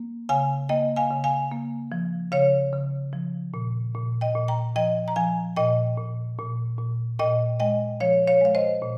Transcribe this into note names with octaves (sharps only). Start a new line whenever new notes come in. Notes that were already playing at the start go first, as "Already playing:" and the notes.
Already playing: A#3
C#3 F5 G#5
A#3 D#5 G5
F5 G#5
C#3
F5 G#5
A#3
F3
C#3 C#5 F5
C#3
F3
A#2
A#2
D#5 G5
A#2
G5 A#5
F3 D#5 G5
A#5
F3 F5 G#5
A#2 D#5 G5
A#2
A#2
A#2
A#2 D#5 G5
G#3 D#5 G5
F3 C#5 F5
C#5 F5
G#3 F5
C5 D#5
A#2